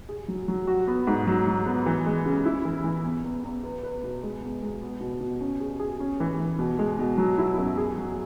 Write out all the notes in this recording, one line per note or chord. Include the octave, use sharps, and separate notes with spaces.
G#4
F#3
F#3
F#4
B3
G#2
F#3
F#3
B3
E3
G#3
C#3
E4
E3
E3
E2
E2
E2
B4
B4
B2
G#3
E2
G#3
B3
B2
B2
C#4
G#4
G#4
C#4
E3
E3
B2
G#3
B2
F#3
E4
F#2
G#4
F#3